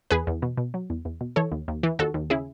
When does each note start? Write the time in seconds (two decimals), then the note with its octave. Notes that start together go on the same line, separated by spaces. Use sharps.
0.10 E2 G#4 B4
0.27 E2
0.42 B2
0.57 B2
0.74 F#3
0.90 E2
1.05 E2
1.21 B2
1.36 E3 A4 C#5
1.52 D#2
1.68 D#2
1.83 E3
1.99 D#2 F#4 A4
2.14 D#2
2.30 C#3 E4 G#4